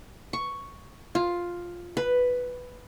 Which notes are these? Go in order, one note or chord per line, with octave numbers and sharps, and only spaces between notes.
C#6
F4
B4